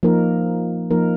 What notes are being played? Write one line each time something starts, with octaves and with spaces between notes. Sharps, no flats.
F3 A#3 D#4 A#4
F3 A#3 D#4 A#4